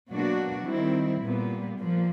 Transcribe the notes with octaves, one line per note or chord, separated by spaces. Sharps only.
B2 F#3 A#3 D4 F#4
D#3 G3 C4 E4
A#2 G3 B3
A#2 F3